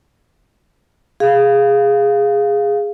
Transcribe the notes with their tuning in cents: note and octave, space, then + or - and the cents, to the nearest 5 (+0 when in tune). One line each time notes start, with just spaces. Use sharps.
G#4 -10 F5 +0